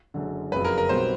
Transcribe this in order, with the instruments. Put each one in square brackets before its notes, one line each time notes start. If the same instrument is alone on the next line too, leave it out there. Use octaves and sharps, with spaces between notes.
[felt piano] F#1 F#2 D3
[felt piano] F#1 F2 C#3 F#3 [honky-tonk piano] B4
[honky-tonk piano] A#4
A#4
[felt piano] B1 B2 G3 C4 [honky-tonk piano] C5